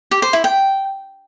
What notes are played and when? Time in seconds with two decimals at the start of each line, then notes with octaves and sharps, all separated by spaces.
0.11 G4
0.22 C5
0.33 E4
0.44 G5